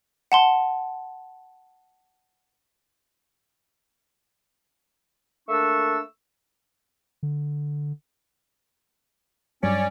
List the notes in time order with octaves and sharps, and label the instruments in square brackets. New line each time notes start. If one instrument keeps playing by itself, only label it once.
[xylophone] F#5 A5 C6
[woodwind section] A3 A#3 D4 C#6 E6
[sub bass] D3
[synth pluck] G2 F#3 G3 [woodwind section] C#4 D5